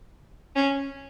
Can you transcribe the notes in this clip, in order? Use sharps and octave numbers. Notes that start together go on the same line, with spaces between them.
C#4